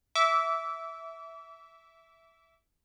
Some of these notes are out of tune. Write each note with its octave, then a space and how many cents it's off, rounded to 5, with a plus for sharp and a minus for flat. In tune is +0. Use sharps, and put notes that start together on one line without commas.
E5 -5 D6 -35